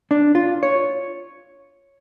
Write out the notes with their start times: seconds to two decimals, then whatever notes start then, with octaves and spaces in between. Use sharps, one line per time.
0.11 D4
0.35 F4
0.63 C#5